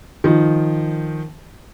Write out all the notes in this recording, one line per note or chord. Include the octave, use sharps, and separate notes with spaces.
D#3 F3